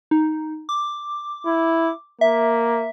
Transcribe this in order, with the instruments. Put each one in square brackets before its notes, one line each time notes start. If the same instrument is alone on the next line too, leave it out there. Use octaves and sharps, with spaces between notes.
[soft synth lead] D#4
D6
[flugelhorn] E4
[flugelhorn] A#3 [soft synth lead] E5